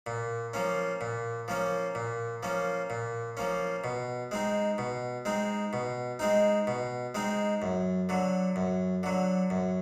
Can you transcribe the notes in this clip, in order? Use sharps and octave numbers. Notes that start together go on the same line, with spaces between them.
A#2
F3 A#3 C#4
A#2
F3 A#3 C#4
A#2
F3 A#3 C#4
A#2
F3 A#3 C#4
B2
G#3 C4 D#4
B2
G#3 C4 D#4
B2
G#3 C4 D#4
B2
G#3 C4 D#4
F#2
D3 F#3
F#2
D3 F#3
F#2